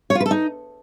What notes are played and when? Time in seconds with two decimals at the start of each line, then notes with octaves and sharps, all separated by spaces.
0.10 C#5
0.15 F4
0.20 B4
0.26 A4
0.31 D#4